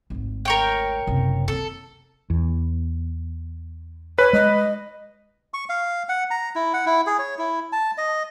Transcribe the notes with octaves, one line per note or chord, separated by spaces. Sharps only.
G#1 D2
A#4 C#5 G5
F#1 C3
A#3 C4 A4
E2
B4 C#5
G#3 D#5
C#6
F5
F#5
A#5
E4
F#5
E4
G#4
C#5
E4
A5
D#5